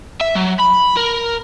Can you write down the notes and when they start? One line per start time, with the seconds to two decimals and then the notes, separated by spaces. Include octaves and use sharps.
0.21 E5
0.36 F#3
0.60 B5
0.97 A#4